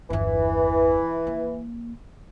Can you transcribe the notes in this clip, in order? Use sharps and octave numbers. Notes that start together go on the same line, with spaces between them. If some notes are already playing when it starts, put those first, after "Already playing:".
G1 E2 E3
A#3